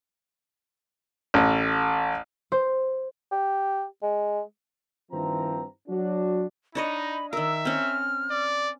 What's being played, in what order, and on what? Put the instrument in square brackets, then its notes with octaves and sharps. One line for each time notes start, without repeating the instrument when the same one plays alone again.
[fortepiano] A1
[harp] C5
[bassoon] G4
G#3
[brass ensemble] G2 D#3 F3 C4 E4 A#5
F#3 D4 F#4
[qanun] D4 C#5 D#5 [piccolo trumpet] D#4 [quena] B5
[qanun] D#3 A#4 [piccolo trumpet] E5 [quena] E6
[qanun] C4 C#4 [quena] F6
[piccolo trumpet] D5